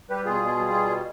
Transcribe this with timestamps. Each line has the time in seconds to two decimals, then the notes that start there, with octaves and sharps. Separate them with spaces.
0.09 G3 G4 B4
0.25 B2 F4 G#4
0.42 B2
0.58 G3
0.73 B2
0.90 G3